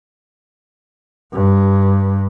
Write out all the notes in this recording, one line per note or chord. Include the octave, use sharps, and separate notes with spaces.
G2